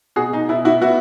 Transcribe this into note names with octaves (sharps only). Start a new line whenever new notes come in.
B2 F#4 G#4
D#4
B2 E4
E4 F#4
B3 E4 F#4